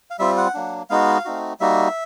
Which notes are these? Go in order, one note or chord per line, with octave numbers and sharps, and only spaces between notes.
F5
G3 C4 F4 E5
F#5
F#3 A#3 D4
G#3 B3 D#4 F#4 F5
A3 C4 D#4 F#4
G3 A#3 D#4 F#4 E5